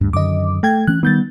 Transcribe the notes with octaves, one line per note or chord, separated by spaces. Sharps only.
D2 G2
F#2 D3 D#3 D#5 D6
A3 G5 G#6
E3 A3 C#4 F#6
D#3 G3 B3 G6 A6